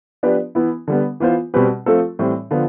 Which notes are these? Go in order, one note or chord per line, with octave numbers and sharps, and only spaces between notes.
F3 B3 D4 G4 B4
E3 B3 E4
D3 G3 B3
E3 B3 F4 C5
B2 G3 C4 G4 B4
F3 A3 C4 F4 A4
A2 E3 G3 C4
D3 F3 B3 F4